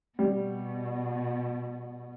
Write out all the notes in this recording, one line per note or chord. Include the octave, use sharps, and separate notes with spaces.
B2 G3